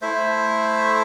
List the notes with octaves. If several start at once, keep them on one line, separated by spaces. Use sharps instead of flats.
A3 E4 C5 E5